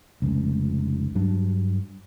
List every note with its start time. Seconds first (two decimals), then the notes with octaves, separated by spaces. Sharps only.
0.22 F1 C#2
1.15 G2 F#3 D4